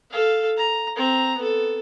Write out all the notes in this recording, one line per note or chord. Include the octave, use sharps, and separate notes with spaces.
A4 F5
A#5
C4 A#5
B3 A4